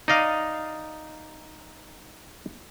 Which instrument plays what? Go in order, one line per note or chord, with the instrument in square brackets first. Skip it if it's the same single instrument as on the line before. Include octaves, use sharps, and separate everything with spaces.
[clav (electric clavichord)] D#4 D5 D#5 F5